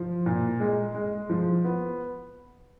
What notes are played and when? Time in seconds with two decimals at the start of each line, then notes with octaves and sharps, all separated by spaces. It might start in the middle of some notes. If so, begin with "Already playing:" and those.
Already playing: F3
0.26 A#2
0.60 G#3
0.95 G#3
1.30 F3
1.64 B3